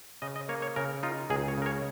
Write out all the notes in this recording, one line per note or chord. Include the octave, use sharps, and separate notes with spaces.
C#3 D#5
D#5
A#3 C#5
C#5
C#3 A#4
D#4 F4
C#2 G#4
C#5
C#3 A#4
C#5